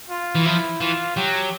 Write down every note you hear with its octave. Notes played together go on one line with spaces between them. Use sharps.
F4
E3
F3 E4
E3 F4
F#3 G4